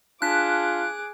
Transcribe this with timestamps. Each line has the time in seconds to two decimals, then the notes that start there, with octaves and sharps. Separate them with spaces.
0.22 D4 F4 G#4 A5 D6 F#6 B6